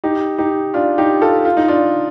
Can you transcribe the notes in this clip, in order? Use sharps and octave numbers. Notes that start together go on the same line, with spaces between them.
D#4 G4
D#4 G4
D4 F4
D#4 G4
F4 A4
F4
D#4
D4 F4